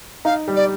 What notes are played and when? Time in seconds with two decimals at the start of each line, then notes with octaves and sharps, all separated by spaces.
0.25 D#4 F5
0.48 G3
0.55 D5